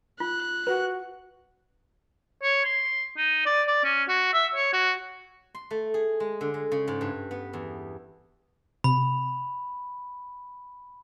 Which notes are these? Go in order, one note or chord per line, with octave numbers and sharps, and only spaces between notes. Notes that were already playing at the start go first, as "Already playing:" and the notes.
F4 F#6
F#4 B4
C#5
C6
D#4
D5
D5
C#4
F#4
E5
C#5
F#4
C6
A3
G#4
G#3
D3
G#3
C#3
G#2
G2
B3
E2
C3 B5